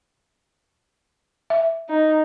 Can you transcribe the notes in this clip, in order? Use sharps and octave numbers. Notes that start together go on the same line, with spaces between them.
E5
D#4